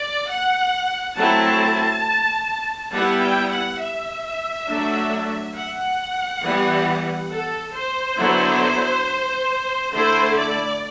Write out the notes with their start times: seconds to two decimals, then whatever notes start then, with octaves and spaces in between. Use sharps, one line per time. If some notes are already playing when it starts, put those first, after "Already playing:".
Already playing: D5
0.30 F#5
1.16 F#3 A3 C4 E4 A5
2.92 G3 B3 E4 F#5
3.21 G5
3.51 F#5
3.80 E5
4.67 F#3 A3 D4
5.55 F#5
6.43 E3 G3 B3
7.31 A4
7.75 C5
8.18 D3 F#3 B3 E4
9.94 D3 A3 E4 C5
10.37 D5